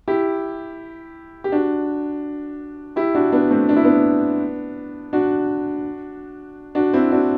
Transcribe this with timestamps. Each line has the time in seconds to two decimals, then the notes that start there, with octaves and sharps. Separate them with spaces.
0.08 E4 G4
1.44 G4
1.52 D4 F#4
2.96 E4 G4
3.15 D4 F#4
3.32 B3 D4
3.51 A3 C4
3.69 D4
3.76 E4
3.84 B3 D4
5.13 D4 F#4
6.75 D4 F#4
6.93 C4 E4
7.11 D4 F#4